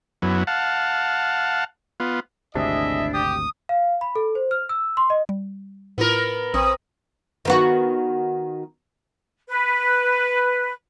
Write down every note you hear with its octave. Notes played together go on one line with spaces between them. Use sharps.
F#2 F#3 B3 E4
F5 F#5 A5
B3 F4
G#1 D2 C3 D4 E4 G#4 D#5 E5
G4 D#6
F5
B5
A4
C5
F6
E6
C6
D#5
G3
A2 B3 E4 F4 A#4
A#1 C4 D#6
D#3 B3 F#4
B4